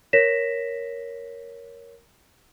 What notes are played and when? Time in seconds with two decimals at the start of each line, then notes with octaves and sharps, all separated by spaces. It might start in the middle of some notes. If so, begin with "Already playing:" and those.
0.13 A#4 C#5 A#6 B6 E7